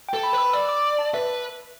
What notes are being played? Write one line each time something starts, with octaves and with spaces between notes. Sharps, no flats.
G5
A4
B5
B4 E6
D5 E6
D6
A5
B4 E5